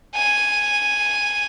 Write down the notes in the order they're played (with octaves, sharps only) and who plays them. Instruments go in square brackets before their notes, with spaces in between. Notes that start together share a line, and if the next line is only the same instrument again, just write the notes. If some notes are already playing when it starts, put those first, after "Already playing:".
[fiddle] G#5